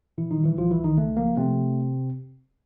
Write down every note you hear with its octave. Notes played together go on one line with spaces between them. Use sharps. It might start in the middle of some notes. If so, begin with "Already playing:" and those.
A#2 E3 E4
D#3 D#4
G3
E3 E4
C2 F3 F4
E3 E4
C2
D#3 D#4
C#3 A3
F3 A#3
C3 A3 C4